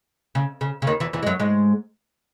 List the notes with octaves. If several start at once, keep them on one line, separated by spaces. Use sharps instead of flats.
C#3
C#3
C#3
D#2 D#3
E2 E3
E2 E3
G#3
F#2 F#3
G#2 G#3